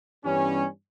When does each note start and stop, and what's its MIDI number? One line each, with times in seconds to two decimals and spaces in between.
0.23 0.66 43
0.23 0.66 52
0.23 0.66 55
0.23 0.66 59
0.23 0.66 61